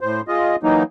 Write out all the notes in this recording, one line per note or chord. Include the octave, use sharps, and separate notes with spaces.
A2 C5
G#3 F4 D#5
E3 F#3 A#3 D#4